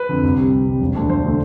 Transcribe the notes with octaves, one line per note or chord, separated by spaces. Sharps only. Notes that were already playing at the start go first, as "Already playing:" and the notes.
Already playing: B4
F2 D3
C2
C3 G3
C2
C3 G3
E1
D2 D3 A3 D4
E1 C5
D3 A3 D4